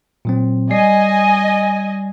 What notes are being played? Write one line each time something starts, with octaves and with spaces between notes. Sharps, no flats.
A#2 F#3 C4
G3 D5 D#5 G#5 C7